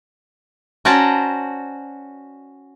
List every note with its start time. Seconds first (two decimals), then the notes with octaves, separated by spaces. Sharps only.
0.85 C#4 F#4 C5 D5 A5 A#5